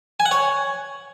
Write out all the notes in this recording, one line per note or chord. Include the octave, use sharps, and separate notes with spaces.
G#5
F#5
C#5